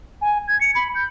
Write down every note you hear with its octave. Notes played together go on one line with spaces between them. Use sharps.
G#5
G#6
C#7
B5
G6